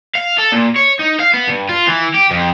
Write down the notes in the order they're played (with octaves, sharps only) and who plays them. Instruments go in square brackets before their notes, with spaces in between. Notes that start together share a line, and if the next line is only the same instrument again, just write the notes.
[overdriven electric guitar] F5
A4
A#2
C#5
D#4
F5
B3
G2
F4
E3
G4
F2